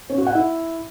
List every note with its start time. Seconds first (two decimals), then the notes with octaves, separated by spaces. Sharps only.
0.09 C#4
0.18 F#4
0.27 F#5
0.35 E4